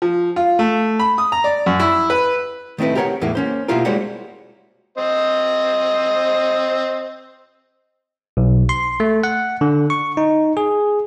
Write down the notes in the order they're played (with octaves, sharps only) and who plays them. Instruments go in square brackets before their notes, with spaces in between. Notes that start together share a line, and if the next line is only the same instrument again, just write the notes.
[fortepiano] F3
F4
A3
B5
D#6
A#5
D5
F#2
E4
B4
[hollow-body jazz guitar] D#3 A3 C4 E4 B4
G4 G#4 A#4 B4 C#5 F#5
E2 A2 E3 G#3 A#3
A#3 C#4 C5
B2 A#3 E4 F4 G4 A#4
G3 G#3 A#3 F#4 C5 C#5
[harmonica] C4 C5 D#5
[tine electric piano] B1
C6
A3
F#5
D3
C#6
D#4
G#4